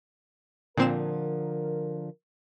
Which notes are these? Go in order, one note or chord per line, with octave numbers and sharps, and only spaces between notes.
A#2 D3 F3 C4 A#4 E7